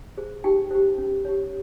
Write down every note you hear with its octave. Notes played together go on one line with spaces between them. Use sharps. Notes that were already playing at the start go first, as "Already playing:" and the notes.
G#4 C5
D#4 G4 G5
G4 C5
C#4
G4 C#5